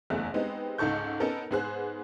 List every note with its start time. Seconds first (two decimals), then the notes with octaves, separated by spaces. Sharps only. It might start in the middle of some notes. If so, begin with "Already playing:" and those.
0.10 F#1 E2 A3 E5 F#6
0.34 G#3 B3 C4 D#4 G4
0.78 C#2 G#2 D#4 A4 C#6 G6
1.20 B3 C#4 D#4 A4 A#4
1.51 G#2 B3 G#4 C5 F#6